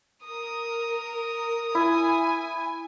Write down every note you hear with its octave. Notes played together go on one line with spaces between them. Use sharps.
A#4 D#6
E4 G#5